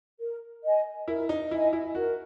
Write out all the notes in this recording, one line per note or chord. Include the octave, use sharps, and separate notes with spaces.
A#4
D#5 G#5
E4 A#4
D#4
E4 D#5 G#5
E4
F#4 A#4